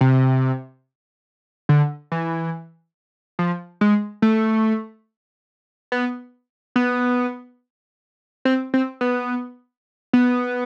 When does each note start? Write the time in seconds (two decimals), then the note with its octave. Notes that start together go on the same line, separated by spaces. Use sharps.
0.01 C3
1.69 D3
2.12 E3
3.39 F3
3.81 G#3
4.22 A3
5.92 B3
6.76 B3
8.45 C4
8.74 C4
9.01 B3
10.13 B3